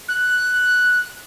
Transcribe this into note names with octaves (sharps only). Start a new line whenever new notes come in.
F#6